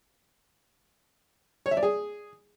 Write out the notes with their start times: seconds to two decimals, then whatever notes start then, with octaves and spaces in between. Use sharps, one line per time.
1.66 C#5
1.71 E5
1.77 D5
1.83 G#4